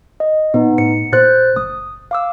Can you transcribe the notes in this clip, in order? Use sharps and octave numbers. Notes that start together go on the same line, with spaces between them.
D#5
A#2 B3 D#4
A2 C#7
A#2 C5 F#6 A6
F#1 D#6
F5 D6 E6